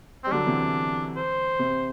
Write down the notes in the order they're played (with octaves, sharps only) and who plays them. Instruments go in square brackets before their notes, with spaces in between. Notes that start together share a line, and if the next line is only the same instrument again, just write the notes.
[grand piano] G3 [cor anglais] C4
[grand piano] D3 F#3 [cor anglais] D4
[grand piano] C3 E3
[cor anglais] C5
[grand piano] C3